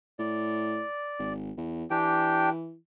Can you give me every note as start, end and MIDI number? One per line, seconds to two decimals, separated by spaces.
0.19 0.83 45
0.19 1.33 74
1.19 1.52 32
1.57 1.85 40
1.91 2.76 52
1.91 2.50 62
1.91 2.50 67
1.91 2.50 79